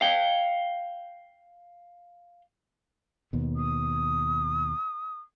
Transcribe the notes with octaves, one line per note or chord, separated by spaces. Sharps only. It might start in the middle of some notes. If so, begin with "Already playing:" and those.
F5 G5
D#2 B2
D#6